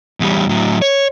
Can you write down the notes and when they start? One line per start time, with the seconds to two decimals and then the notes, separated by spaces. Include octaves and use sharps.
0.20 E2 G3
0.49 A2 F#3
0.82 C#5